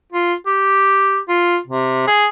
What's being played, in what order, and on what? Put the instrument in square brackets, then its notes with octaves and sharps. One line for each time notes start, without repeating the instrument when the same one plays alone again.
[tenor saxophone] F4
G4
F4
C3
G#4